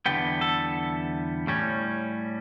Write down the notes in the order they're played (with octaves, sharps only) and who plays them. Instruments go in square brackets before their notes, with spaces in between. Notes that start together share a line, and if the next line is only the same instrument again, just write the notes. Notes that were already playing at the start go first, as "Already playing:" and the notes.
[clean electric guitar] E2 D3 G3 B3 G5
A4
A2 G3 C#4